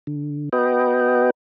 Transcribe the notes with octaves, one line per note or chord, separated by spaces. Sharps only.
D3
B3 F#4 B4 D#5 G5